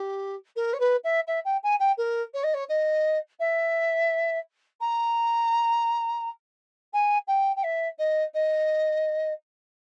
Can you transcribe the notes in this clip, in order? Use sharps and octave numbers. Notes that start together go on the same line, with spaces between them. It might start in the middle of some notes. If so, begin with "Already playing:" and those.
Already playing: G4
A#4
C#5
B4
E5
E5
G5
G#5
G5
A#4
C#5
D#5
C#5
D#5
E5
A#5
G#5
G5
G5
E5
D#5
D#5